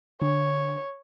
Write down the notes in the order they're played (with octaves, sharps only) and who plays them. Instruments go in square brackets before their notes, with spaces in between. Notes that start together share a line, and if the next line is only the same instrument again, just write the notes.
[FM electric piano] D3 [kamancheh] C#5